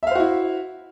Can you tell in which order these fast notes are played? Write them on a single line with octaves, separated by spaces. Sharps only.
E5 F5 C5 F#4 E4